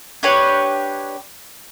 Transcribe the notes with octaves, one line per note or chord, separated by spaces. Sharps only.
D4 G4 B4 C#5